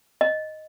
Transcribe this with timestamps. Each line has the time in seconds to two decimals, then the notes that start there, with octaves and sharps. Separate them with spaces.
0.21 D#5